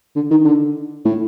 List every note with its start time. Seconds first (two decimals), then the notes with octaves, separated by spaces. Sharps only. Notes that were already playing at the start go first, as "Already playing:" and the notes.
0.16 D3
0.31 D#3
0.45 D3
1.05 A2